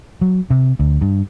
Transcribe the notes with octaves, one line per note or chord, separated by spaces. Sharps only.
F#3
C3
D2
G2